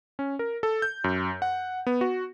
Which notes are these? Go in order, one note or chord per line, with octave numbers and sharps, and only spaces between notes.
C#4
A#4
A4
G6
F#2
F#5
B3
F#4